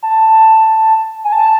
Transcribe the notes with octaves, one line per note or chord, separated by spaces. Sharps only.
A5
G#5
A5